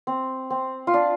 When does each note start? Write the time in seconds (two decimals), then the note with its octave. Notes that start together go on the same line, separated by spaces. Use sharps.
0.07 C4
0.50 C4
0.87 F4
0.94 D4